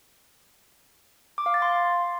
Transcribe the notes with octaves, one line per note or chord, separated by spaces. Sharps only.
D6
F5
A6
C6